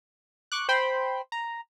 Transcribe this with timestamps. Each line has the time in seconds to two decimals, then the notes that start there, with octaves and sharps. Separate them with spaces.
0.52 C#6 D6 F#6
0.69 C5 G5 B5 C6
1.32 A#5